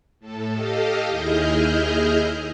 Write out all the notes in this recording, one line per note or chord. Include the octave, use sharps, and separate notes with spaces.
A2 A4
G4 A4 D#5 F5
D#2 E4 G#4 D#5 F6 G6